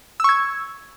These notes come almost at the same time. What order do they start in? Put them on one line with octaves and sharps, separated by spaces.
E6 C#6 G#6